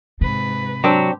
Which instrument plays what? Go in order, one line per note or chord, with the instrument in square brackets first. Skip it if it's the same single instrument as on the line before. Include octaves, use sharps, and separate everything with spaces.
[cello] G#2 B4 [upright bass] C3
[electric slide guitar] F#3 [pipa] C4 D4 G4